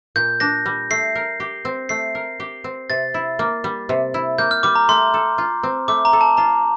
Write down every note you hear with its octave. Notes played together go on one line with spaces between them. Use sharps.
A#2 G6
D4 A#6
G3
A3 C7
A#4
G4
C4
A3 C7
A#4
G4
C4
C3 A6
E4
A#3
G3
C3
E4
A#3 G6
F6
G3 D6
A#5
A3 C6
A4
F4
C4
A3 D6
A#5
A4
A5
F4 A#5